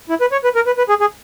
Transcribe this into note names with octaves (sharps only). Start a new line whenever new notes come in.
E4
B4
C#5
B4
A#4
B4
B4
G#4
G#4